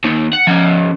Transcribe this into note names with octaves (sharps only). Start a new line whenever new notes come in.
D#2 D#3
F#5
F3 C#4